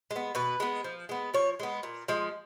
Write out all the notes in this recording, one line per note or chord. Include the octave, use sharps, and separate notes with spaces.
G#3
B3
B2 B4
G#3 B3
F3
G#3 B3
F3 C#5
G#3 B3
A#2
F3 G#3